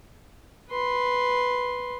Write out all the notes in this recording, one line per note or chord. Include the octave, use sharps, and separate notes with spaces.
B4 C6